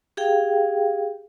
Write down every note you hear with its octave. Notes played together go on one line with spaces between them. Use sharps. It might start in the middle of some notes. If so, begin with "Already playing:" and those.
G4 G#4 F5 G5